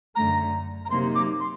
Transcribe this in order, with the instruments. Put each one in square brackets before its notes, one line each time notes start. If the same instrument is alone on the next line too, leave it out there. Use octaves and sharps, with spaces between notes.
[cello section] F#2 D3 A3 [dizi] A#5
[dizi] A#5
[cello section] C3 F#3 A#3 D#4 [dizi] C6
[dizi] D6
C6